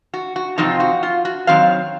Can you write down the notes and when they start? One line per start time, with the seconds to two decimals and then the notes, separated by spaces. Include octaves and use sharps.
0.14 F#4
0.36 F#4
0.58 F2 C3 F3 C4 D#4 F4
0.80 F#4
1.03 F4
1.25 F#4
1.47 D#3 F#3 C4 F5